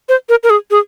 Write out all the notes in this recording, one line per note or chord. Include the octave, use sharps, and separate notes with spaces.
C5
A#4
A#4
G#4
G#4